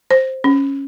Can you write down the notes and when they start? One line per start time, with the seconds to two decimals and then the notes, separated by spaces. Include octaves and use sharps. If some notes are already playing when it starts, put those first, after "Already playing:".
0.11 C5
0.44 C#4